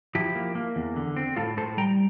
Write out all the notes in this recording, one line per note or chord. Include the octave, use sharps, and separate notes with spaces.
F3 E4 G4
A#3
A#3
E2
D3
C4
A2 F4 A4
A2 A4 C5
G3 G5 A#5